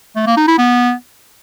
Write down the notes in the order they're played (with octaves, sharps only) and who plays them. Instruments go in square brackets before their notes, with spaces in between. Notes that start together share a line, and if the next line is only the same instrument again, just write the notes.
[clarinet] A3
A#3
D#4
E4
B3